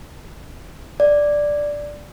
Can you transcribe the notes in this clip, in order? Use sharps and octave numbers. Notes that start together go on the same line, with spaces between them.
D5